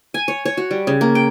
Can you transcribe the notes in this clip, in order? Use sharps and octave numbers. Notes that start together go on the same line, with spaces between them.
G#5
C#5
C#5
F#4
G3
C#3
A#3
G5